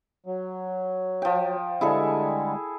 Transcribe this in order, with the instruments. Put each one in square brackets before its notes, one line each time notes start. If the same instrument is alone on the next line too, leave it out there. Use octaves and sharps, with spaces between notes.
[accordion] F#3
[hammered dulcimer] F3 G5
[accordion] D3 G3 G#3 [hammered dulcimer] E4 G#4 A4